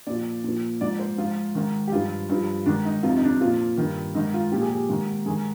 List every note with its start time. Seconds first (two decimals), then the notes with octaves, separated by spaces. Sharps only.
0.07 A#2 F3 D5
0.44 A#2 F3
0.81 G#2 F3 D5
0.99 C5
1.18 G#2 F3 F4
1.55 G#2 D#3
1.88 G4
1.92 G2 F3 F4
2.29 G2 F3
2.66 G#2 D#3 D4
2.85 D#4
3.03 F2 C3 F3 F4
3.16 D#4
3.24 D4
3.28 D#4
3.41 A#2 F3 F4
3.77 G2 D#3
4.15 G#2 D#3 D#4
4.34 F4
4.52 A#2 F3 G4
4.61 G#4
4.71 G4
4.89 G#2 D#3
5.26 G#2 D#3 G#4